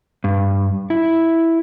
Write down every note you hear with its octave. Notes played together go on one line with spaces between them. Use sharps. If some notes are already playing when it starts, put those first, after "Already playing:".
G2
E4